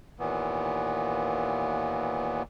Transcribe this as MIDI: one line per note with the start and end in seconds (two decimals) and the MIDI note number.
0.19 2.43 39
0.19 2.43 46
0.19 2.43 52
0.19 2.43 59